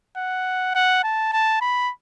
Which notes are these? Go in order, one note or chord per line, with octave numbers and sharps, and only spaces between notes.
F#5
F#5
A5
A5
B5